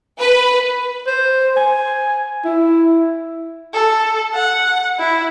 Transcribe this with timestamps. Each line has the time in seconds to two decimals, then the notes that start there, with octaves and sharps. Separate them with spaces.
0.19 B4
1.07 C5
1.56 G#5
2.45 E4
3.74 A4
4.34 F#5
4.99 E4